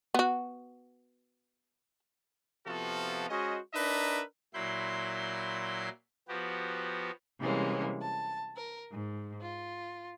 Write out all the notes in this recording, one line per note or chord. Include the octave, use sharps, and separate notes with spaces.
B3 F#4
C3 F3 B3 F4 F#4 A4
G#3 C#4 F#4 C5 D#5
D4 D#4 A#4 B4 D#5 E5
A#2 F#3 E4 B5 C6 G6
F3 B3 F#4 G4
C3 E3 G3 G#3 A#3 C#4
A5
A#4
G#2
F4